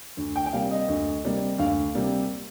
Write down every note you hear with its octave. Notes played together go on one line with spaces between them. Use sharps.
D2
G5
G5
C3 G3 A#3 F5
D#5
D2
C3 G3 A#3
D2 F5
C3 G3 A#3